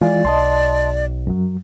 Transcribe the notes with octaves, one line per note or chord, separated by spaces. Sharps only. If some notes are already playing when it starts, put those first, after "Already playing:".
E3 G#3 F4 D5
B1 D#5 A5 C6
F#2 F#3